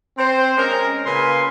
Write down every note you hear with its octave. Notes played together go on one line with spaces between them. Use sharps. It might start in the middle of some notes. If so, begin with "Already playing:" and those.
C4 C5
G#3 C#4 A#4
A#2 C#3 B4 G#5 C6